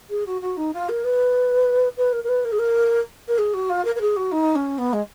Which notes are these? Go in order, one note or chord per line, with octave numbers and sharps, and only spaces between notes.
G#4
F#4
F#4
D#4
F4
A#4
B4
B4
A#4
A#4
B4
A#4
G#4
A#4
A#4
G#4
F#4
F4
A#4
A#4
G#4
F#4
D#4
C#4
B3
G#3